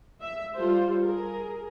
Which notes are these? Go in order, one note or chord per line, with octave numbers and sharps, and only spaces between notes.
E5
G3 F4 A4 C5
G#4 A#4